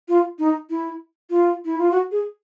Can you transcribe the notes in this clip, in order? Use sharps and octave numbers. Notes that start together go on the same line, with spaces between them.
F4
D#4
E4
F4
E4
F4
F#4
G#4